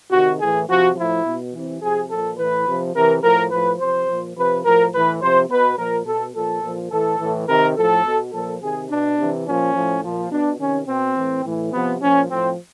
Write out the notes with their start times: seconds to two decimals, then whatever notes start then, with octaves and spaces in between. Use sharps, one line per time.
0.10 C3 D#3 F#4
0.39 A2 E3 G#4
0.68 C3 F3 F#4
0.95 A2 F3 E4
1.24 B2
1.52 C3 E3
1.81 C3 F3 G#4
2.09 A#2 F3 A4
2.37 A2 E3 B4
2.66 C3 F3
2.94 C3 E3 A#4
3.22 A2 F3 A#4
3.51 A2 F3 B4
3.79 C3 F3 C5
4.07 A#2 F3
4.35 C3 F3 B4
4.64 A2 F3 A#4
4.92 A2 E3 B4
5.21 C3 F3 C5
5.49 B2 B4
5.77 A#2 F3 A#4
6.05 B2 A4
6.34 A#2 F3 A4
6.62 A#2 F3
6.90 A2 E3 A4
7.19 A2 E3
7.47 C3 D#3 A#4
7.76 A2 F3 A4
8.05 B2
8.32 A#2 F3 A4
8.61 C3 D#3 G#4
8.89 B2 D4
9.17 C3 E3
9.46 A#2 F3 C#4
9.75 A2 F3
10.02 A#2 F3
10.30 B2 D4
10.59 C3 D#3 C#4
10.87 B2 C4
11.16 A2 E3
11.44 A2 E3
11.72 C3 F3 B3
12.01 A#2 F3 C#4
12.29 A2 F3 C4